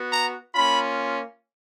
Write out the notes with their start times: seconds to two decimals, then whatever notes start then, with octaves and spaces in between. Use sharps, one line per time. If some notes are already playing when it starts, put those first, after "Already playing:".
Already playing: B3 F#4
0.12 A#5
0.53 A#3 C#4 F4 B5